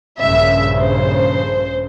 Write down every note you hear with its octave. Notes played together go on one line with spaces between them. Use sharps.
A#1 G2 C#3 E5
C5